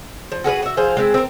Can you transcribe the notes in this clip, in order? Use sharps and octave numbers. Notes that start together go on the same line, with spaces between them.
F3
F#4 G#4 A#4 B4
F#4 E5
F3 G#4 C5 F5
G#3 C4 E4
C4 A#4